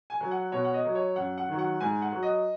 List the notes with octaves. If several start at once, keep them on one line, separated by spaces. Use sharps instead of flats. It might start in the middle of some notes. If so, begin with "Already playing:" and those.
G#5
F#3
F#5
B2 C#5
F#5
D#5
F#3
C#5
F#2 F#5
F#5
D#3 F#3
F#5
G#2 G#5
F#5
F#3
D#5